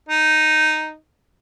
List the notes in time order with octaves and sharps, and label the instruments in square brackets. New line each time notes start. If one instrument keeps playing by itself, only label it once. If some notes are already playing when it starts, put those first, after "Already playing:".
[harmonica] D#4